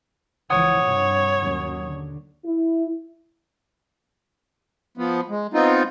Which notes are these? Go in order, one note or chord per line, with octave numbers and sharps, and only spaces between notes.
C#2 E3 F3 C#5 F#5 D#6 G#6
G2 C3
D#2 F#3 C#4
D3
E4
F3 B3
G#3
B3 C4 D#4 F4